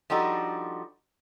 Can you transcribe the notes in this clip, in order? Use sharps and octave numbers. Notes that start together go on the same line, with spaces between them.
F3 G3 D4 D#4 F#4 A4